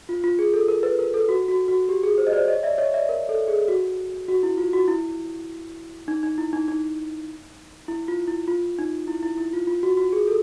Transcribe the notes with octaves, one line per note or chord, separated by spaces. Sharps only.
F4
F4
G#4
A4
A#4
B4
A#4
A4
F#4
F#4
F#4
G4
G#4
C5
D#5
C5 D5
C#5 D#5
D5 E5
C#5 D#5
D5 E5
A#4
A4
G#4
F#4
F#4
E4
F4
F#4
E4
D#4
D#4
E4
D#4
D#4
E4
F4
E4
F4
D#4
E4
E4
E4
F4
F4
F#4
F#4
G#4
A4